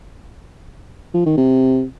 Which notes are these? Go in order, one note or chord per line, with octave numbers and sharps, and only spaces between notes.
F3
D#3
C3